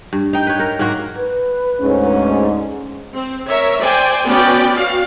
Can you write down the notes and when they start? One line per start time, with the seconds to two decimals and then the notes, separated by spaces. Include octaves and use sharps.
0.13 G2
0.33 D#4 G5
0.47 B4 C#5
0.59 A#4
0.79 G#2 F#3 A#3 F#4
1.16 B4
1.81 D2 G#2 C#4
3.14 C4
3.48 A#4 C#5 E5
3.80 C5 D5 G5 G#5
4.26 B3 C#4 F#4 B4 D5 G5
4.73 F#4 F5